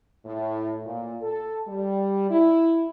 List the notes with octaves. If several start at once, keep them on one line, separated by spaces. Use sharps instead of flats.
A2
A#2
A4
G3
E4